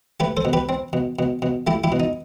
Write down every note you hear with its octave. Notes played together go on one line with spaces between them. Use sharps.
A3 G4 B4
A4 C5
B2
G4 B4
C4
B2
B2
B2
A3 E4 G4
E4 G4
B2
D#4